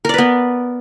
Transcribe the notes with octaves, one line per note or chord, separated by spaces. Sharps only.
B3 A#4 B4 D5